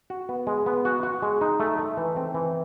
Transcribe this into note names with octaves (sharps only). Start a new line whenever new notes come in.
F#4
B3
G#3
B3
F#4
F#4
G#3
D#4
A3
A3
E3
C4
E3